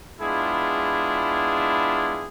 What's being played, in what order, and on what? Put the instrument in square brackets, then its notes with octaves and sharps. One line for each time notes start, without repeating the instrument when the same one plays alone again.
[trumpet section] G#3 B3 D4 E4 F4 G#4